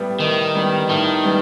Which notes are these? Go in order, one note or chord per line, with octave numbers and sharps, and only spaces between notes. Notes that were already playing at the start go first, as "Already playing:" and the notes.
Already playing: A2 G3 B3
A2 D#3
G3 B3
A2 D#3
G3 B3